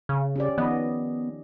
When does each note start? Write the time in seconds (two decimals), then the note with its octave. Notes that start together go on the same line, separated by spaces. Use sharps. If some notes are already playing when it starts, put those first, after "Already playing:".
0.09 C#3
0.36 C#4 G4 D5
0.58 D#3 F3 B3 D#5